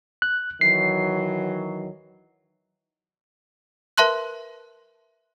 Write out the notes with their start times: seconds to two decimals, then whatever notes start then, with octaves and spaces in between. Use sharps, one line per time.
0.22 F#6
0.61 D#3 E3 F#3 C7
3.98 A#4 B4 E5 A5 C6 F#6